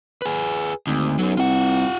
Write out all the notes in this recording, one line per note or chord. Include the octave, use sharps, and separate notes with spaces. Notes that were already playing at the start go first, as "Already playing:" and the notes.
G#4 B4
G#1 D2
B1 F#3 C#4
C2 F4 F#5